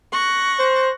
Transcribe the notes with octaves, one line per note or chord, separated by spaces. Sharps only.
C#6 F#6 A#6
C5